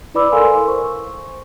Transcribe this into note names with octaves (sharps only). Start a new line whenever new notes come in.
E4 B4 D5 B5 D6 E6
A4 A#4 F5 G#5 C6 E6
C5 C#6